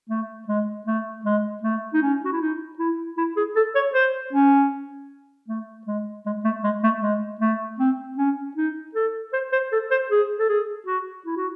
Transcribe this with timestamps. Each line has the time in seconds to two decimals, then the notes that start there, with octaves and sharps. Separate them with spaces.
0.09 A3
0.48 G#3
0.87 A3
1.25 G#3
1.63 A3
1.94 D#4
2.02 C#4
2.25 F#4
2.32 E4
2.41 D#4
2.78 E4
3.18 E4
3.37 G#4
3.56 A4
3.75 C#5
3.94 C5
4.33 C#4
5.48 A3
5.87 G#3
6.26 G#3
6.44 A3
6.64 G#3
6.83 A3
7.02 G#3
7.41 A3
7.79 C4
8.18 C#4
8.57 D#4
8.95 A4
9.33 C5
9.52 C5
9.72 A4
9.91 C5
10.10 G#4
10.39 A4
10.49 G#4
10.87 F#4
11.26 E4
11.37 F#4